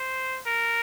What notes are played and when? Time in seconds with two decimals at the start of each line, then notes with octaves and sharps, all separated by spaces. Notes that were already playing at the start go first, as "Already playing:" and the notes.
Already playing: C5
0.47 A#4